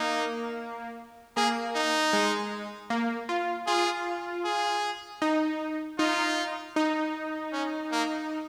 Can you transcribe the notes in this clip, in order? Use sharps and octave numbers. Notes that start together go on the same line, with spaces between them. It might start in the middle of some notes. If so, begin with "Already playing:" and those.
Already playing: A#3 D#4
A#3 G#4
D#4
G#3
A#3
F4
F4 G#4
G#4
D#4
D#4 F4
D#4
C#4
A#3